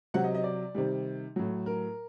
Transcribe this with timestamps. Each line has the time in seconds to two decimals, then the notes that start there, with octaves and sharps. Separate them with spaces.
0.14 C3 F#3 F#5
0.24 D#5
0.34 D#5
0.44 D5
0.75 C3 D#3 G3
1.36 A2 F#3
1.66 A#4